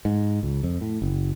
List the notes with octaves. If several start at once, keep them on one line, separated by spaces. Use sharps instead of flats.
G#2
C#2
F2
A2
F#1